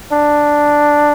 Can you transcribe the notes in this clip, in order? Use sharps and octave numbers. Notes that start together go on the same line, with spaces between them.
D4